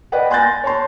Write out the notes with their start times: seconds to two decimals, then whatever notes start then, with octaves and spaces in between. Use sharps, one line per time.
0.12 B4 D5 D#5 F#5 G5
0.31 G#5 C6 F#6 G6 A6 A#6
0.64 C#5 A5 C6